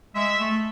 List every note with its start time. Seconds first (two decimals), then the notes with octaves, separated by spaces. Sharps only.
0.15 G#3 E5
0.40 A3